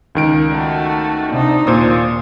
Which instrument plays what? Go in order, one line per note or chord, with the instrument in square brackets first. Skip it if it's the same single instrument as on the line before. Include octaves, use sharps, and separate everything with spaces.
[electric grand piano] C#2 D#3 D7
[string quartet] A3 F#4
C3 D4 D#4
[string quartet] D#2 [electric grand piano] A#2 C5 D#6